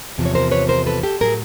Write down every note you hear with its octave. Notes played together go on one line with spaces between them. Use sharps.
E2 C3 F3
C#5
A#4 C5
B4 C#5
A#4 C5
A4 B4
G4 A4
A2 F#3 G#4 A#4